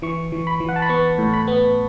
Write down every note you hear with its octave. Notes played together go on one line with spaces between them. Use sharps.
E3 C#6
E3
B5
E3
F#5
A5
B5
B3 C#6
A2
B5
B3